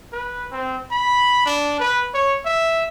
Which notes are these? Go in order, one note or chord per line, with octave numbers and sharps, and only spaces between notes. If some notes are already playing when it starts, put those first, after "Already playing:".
B4
C4
B5
D4
B4
C#5
E5